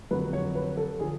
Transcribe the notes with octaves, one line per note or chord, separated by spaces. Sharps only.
F2 D3 F#3 B4
C#5
B4
A4
D3 F3 G#4